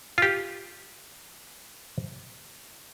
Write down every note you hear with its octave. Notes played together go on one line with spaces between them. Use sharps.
F4 G4